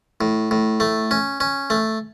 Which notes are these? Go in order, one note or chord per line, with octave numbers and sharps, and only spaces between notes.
A2
A2
A3
C#4
C#4
A3